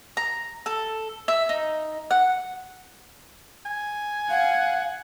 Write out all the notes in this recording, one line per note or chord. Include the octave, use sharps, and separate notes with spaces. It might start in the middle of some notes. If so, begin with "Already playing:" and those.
A#5
A4
E5
D#4
F#5
G#5
F5 F#5